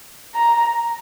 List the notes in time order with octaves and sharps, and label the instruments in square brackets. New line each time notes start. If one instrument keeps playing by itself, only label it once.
[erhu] A#5